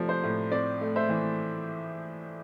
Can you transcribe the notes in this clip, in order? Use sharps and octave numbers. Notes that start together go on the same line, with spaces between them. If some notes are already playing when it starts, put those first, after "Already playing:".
Already playing: C3 F3 A3 D5
C5
A2
C4 D5
A3
C5 E5
E3